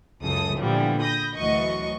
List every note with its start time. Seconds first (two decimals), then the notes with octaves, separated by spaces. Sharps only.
0.22 C#2 F#2 C#3 A4 D#6
0.58 A#2 D3 E3 F3 G3 B3
1.00 B5 D#6 G6 A#6
1.33 D2 E3 F#3 F#4 D#5 C#6